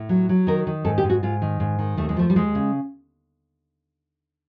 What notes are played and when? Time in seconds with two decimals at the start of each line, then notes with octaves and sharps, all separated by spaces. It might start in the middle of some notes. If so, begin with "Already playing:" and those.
Already playing: A2
0.09 F#3
0.29 F#3
0.47 D#3 A#4
0.67 D#3
0.85 G#2 A4
0.98 G4
1.04 G#2
1.10 F#4
1.23 G#2 F4
1.42 D#3
1.60 G#2
1.79 D#3
1.97 D#2 A3
2.09 G#3
2.17 F3 A3
2.30 G3
2.35 D#2 G#3
2.55 C#3